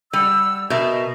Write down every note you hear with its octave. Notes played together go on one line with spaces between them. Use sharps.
G3 D5 F#5 E6
B2 A#4 D#5 E5